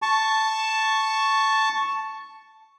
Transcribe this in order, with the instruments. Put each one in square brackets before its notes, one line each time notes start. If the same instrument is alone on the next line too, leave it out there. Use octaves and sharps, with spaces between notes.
[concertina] A5 C#6